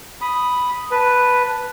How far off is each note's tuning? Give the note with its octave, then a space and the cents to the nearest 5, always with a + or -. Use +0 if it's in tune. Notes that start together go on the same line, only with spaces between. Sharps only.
B5 +0 D#6 +0
B4 +0 A5 +0